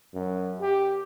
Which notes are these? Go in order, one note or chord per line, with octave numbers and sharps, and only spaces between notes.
F#2
G4